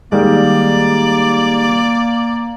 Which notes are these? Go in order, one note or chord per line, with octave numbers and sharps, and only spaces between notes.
D#3 G3 G#3 A#3 D5